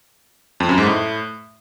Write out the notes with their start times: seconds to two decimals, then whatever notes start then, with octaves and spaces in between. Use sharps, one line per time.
0.60 F2
0.69 F#2
0.78 G#2
0.86 A2